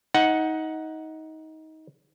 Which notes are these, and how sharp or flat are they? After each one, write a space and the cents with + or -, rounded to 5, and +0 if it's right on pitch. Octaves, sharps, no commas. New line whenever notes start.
D#4 +20 F#5 +0